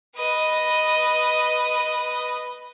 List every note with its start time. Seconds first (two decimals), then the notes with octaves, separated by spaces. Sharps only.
0.16 B4 D#5